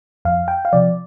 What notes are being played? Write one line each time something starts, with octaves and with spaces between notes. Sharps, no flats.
F2 F5
G5
F5
C3 F3 D5